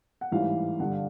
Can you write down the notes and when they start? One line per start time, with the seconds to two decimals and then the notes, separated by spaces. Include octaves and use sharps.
0.21 F#5
0.32 A1 G#2 E3 G3 F5
0.79 G2 D3 G3 F#5
0.91 F5